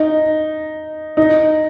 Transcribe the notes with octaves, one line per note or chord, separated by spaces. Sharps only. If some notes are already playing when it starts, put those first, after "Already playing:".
Already playing: D#4
D#4